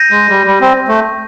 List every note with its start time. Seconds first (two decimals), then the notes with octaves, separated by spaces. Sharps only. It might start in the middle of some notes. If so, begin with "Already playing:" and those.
Already playing: G6 A#6 D#7
0.11 G#3
0.29 G3
0.47 G3
0.61 C4
0.88 A3